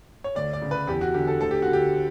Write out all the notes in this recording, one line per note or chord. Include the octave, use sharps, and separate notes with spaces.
C#5
D2 D5
D5
C#3
B4
E2 G4
F#4
D3 G4
A4
D2 A4
G4
D3 F#4
G4